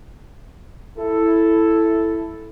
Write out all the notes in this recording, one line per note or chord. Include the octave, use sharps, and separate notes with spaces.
E4 A4